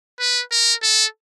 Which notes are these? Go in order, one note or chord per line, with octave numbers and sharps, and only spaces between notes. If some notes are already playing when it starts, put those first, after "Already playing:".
B4
A#4
A4